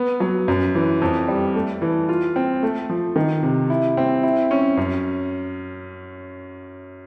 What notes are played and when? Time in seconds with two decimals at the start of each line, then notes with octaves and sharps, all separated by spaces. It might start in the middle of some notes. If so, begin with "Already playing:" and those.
Already playing: B3
0.20 F#3
0.48 F#2
0.75 E3
1.02 F2
1.28 G3
1.56 A3
1.82 E3
2.09 F4
2.36 C4
2.63 A3
2.89 F3
3.16 D#3
3.43 C3
3.70 E4
3.97 C4
4.23 E4
4.51 C#4
4.77 F#2